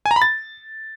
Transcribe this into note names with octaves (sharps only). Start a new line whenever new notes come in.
G#5
A#5
B5
A6